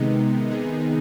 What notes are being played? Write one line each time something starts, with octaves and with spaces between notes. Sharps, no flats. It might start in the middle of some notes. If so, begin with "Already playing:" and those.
Already playing: C3 D#3 G#3 B3 D#4
C3 D#3 B3 D#4 G#4